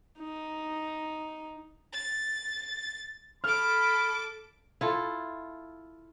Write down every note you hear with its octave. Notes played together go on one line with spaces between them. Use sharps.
D#4
A6
A4 B5 D6 F6
E4 F4 A4